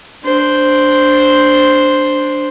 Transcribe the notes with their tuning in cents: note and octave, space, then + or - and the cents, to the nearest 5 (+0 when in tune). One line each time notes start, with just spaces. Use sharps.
D4 +0 C5 +0